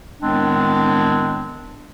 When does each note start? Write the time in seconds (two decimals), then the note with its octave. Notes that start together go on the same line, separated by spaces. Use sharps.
0.21 A2 D#3 G#3 B3 C4 D4